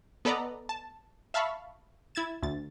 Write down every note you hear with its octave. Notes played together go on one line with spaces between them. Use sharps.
B3 A4 B4 D5 D#5 A#5
A5
E5 F5 A5 B5 C#6
E4 G#6 A6 E7
D2 A6